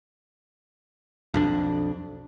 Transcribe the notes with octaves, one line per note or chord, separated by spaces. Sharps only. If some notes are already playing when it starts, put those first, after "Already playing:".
B1 F2 D4